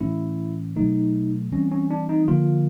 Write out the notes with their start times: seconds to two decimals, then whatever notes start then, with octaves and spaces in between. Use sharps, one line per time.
0.01 A2 E3 A3 C#4 E4
0.76 B2 F#3 A3 D#4
1.52 E3 G3 C4 C#4
1.72 C#4
1.91 D4
2.09 D#4
2.28 D3 F3 A#3 F4